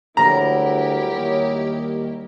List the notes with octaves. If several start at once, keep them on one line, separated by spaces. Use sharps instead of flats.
D2 F#3 G3 E4 G4 A#4 A#5
D#2 G3 D#4 C#5